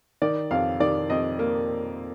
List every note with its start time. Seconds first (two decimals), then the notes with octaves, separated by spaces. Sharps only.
0.22 D#3 D5
0.51 F2 F5
0.80 D#3 D5
1.10 F2 D#5
1.39 A#3